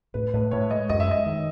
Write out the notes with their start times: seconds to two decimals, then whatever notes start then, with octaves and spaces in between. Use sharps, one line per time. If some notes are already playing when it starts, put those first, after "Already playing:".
0.14 A2 B4
0.34 A2 B4
0.51 A2 C#5
0.71 G#3 D#5
0.89 F#2 D#5
1.00 E5
1.07 G#3 D#5
1.26 D#3